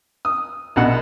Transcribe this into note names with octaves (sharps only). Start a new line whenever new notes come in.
D#6
A#1 B2 F#5